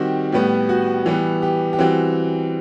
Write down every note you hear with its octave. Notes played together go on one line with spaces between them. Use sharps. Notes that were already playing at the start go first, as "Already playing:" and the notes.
Already playing: D#3 G3 C4 F#4 G4
A2 G3 B3
F#4
E3 G3 B3
G4
G4
E3 G3 C4 F#4